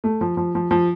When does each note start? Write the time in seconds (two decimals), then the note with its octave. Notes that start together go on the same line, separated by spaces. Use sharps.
0.04 A3
0.21 F3
0.37 F3
0.55 F3
0.71 F3